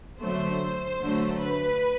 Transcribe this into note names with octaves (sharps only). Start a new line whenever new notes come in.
D3 F#3 A3 C5
D3 F#3 A3
B4